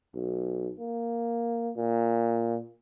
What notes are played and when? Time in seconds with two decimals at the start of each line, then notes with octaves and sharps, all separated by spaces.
0.15 B1
0.79 A#3
1.76 A#2